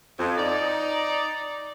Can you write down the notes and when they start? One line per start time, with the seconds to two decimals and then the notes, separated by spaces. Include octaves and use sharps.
0.19 F2
0.37 D#4 D5